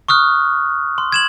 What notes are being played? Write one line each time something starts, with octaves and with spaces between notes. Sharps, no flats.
C#6 D#6 F6 F#6
C6
G#6 E7 F#7